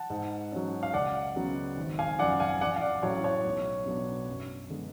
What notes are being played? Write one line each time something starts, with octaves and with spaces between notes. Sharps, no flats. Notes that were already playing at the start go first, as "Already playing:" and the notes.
Already playing: F#5 A5
G#2
F#3 C#4
F5
C#2 D5 F#5
C#3 F#3 B3
G#1
F5 G#5
F#2 F3 D5 F#5
F5 G#5
A1 D5 F#5
F5
D5
A2 F#3 C#4 C#5
C#5
B1
B2 F#3 B3 D4
F#2
D3 G#3 B3 D4